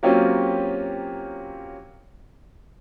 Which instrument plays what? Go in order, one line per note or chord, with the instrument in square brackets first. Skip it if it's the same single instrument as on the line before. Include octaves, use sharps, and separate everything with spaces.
[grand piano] F#3 A#3 C4 C#4 F4 G4